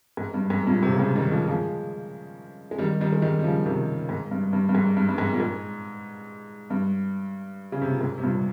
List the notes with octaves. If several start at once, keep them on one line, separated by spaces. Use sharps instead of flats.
G#2
G2
G#2
G2 A#2
G#2 C3
C#3
G#2 C3
D#3 G3
F3 G#3
F3 G#3
G#3
D#3 G3
D#3 G3
G#3
D#3 G3
G3
C#3 F3
C3 D#3
G#2
G2
G2
G2
G#2
G2
G2
G#2
A#2
G#2
G2
C#3
C3
A#2
G#2
C3
G2 A#2